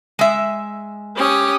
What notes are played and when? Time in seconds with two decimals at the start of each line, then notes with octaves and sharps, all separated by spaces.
0.19 G#3 E5
1.16 C#4 G4 D#6